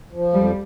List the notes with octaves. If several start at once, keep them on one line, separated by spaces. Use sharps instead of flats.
F3
F2 G3